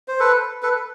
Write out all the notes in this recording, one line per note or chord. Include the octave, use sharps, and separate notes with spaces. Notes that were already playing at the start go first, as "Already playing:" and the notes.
C5
A4 B4
A4 B4